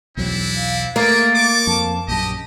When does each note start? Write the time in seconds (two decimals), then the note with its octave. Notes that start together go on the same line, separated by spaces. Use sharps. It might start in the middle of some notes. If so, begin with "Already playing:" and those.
0.17 B1 E2 F#3 C4 D4 E4
0.56 F5
0.96 A3 A#3 E4 G#4 A6
1.35 C#6 D6
1.67 F2 A5
2.08 A#1 F#2 G4 D#5